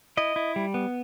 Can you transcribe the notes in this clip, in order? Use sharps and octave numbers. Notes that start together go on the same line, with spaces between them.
E4 D#5
E4
G3
B3